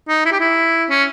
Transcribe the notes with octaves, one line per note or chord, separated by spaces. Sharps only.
D#4
E4
G4
E4
C#4